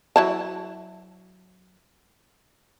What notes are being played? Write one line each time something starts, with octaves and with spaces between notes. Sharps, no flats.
F#3 E4 A5